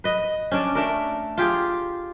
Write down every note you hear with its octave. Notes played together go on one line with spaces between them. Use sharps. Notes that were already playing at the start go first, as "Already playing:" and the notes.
B4 D#5
C#4 D4 D5
A3 D4 A#4
F4 G4 G#4